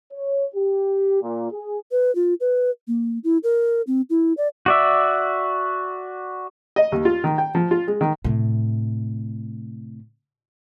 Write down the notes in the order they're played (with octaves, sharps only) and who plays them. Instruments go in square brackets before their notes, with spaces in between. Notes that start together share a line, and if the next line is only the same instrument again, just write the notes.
[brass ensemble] C#5
G4
A#2
G#4
[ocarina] B4
F4
B4
A#3
E4
A#4
C4
E4
D5
[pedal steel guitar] F#4 D5 E5
[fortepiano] D#5
D#2
F4
D#3
G5
F3
F4
G#3
D#3
[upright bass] A2 C3